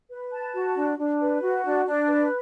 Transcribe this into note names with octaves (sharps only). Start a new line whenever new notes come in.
B4
A5
F#4
D4
D4
B4
F#4
D4
D4
B4